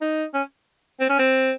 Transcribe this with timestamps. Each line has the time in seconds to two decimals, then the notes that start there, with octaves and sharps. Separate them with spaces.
0.01 D#4
0.34 C#4
1.00 C4
1.10 C#4
1.19 C4